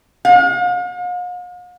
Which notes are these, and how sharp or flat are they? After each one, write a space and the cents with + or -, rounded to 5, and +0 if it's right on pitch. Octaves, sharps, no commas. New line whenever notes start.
F5 +45